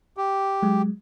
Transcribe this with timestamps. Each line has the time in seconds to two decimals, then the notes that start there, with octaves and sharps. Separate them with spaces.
0.17 G4
0.62 F#3 G#3